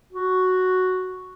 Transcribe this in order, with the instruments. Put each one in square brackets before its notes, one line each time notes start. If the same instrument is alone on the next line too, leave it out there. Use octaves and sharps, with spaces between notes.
[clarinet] F#4